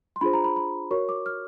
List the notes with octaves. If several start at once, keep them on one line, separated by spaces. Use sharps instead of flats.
C6
D4 F4 G#4 C5 B5
A#5
B5
B5
F#4 A#4 C#5 C#6
D6
F6